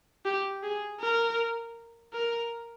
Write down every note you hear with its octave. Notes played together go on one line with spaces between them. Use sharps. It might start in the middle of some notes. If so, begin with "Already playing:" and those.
G4
G#4
A#4
A#4